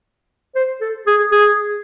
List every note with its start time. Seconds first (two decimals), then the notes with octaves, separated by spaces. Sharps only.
0.55 C5
0.81 A4
1.07 G#4
1.32 G#4